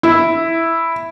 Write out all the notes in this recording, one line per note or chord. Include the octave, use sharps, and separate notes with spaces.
E4